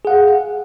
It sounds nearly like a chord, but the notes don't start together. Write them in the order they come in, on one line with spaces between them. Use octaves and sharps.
G#4 F#5 F5